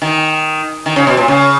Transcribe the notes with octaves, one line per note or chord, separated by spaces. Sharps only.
D#3
D#3
C#3
B2
A#2
C#3